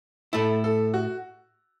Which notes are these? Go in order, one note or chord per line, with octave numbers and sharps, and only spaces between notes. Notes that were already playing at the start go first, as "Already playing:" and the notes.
A2 A3 E4 A4
A4
F#4